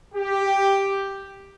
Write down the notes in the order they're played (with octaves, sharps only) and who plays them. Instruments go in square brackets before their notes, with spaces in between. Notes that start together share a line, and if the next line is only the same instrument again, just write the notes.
[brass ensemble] G4